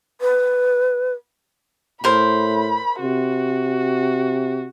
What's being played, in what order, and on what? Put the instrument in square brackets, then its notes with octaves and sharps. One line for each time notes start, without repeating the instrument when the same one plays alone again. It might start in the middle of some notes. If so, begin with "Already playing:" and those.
[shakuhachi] B4
[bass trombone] A2 [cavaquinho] A#4 C5 [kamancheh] B5
[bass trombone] C3 [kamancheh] F#4